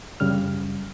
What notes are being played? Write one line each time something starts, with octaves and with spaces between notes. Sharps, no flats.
F#2 C#3 G3 F6